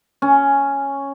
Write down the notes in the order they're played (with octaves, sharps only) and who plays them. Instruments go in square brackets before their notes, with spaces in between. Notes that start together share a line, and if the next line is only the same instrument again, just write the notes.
[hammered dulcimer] C#4